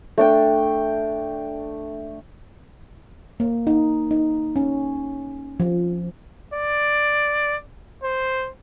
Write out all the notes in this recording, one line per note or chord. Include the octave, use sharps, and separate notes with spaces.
A3 D4 G5
A#3
D#4
D#4
C#4
F3
D5
C5